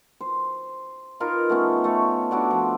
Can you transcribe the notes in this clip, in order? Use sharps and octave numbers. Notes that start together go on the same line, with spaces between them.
C5
D#4 F4 A#4 B4
A3 B3 C#4
A3 C#5
D4 E4 F#4 D5
F3